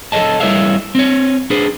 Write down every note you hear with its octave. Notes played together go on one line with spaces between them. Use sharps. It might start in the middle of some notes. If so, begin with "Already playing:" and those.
A4 B4 C#5 D#5 A5
G3 E4 B4 C#5 E5 F5
C4 C#5
D4 G#4 B4 C5